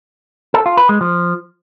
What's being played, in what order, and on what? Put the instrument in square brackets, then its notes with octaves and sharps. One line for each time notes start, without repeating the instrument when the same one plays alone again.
[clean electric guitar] A4
F4
B4
G#3
F3